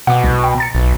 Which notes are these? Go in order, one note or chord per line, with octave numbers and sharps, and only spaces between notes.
B2 F#5 D6
C2
G5
A#5 A6 C#7
B1